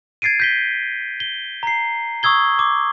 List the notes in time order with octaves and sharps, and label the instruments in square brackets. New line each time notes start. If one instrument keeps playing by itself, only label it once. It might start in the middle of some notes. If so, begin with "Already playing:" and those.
[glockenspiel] G#6 A6 C7 D7 D#7
G6 B6 G7
G7
A#5 C7
C#6 D#6 E6 G#6 G7
D6